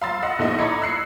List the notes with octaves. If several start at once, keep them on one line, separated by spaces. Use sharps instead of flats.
F5 B5 C6 E6 A6
D#5 F#5 E6
A#1 A3 D#4 E4 D#5
D5 D#5 A#5 B5 G#6 C#7
E6 F#6 C7 C#7